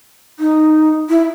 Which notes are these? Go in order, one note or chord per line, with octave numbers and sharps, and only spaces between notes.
D#4
E4